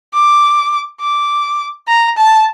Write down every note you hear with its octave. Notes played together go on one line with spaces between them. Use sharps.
D6
D6
A#5
A5